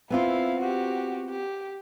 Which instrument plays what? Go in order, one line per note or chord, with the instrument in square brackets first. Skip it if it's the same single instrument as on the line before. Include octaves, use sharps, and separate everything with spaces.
[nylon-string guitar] B3 C4 F4 [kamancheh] E4 F5
[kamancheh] F#4 G4
G4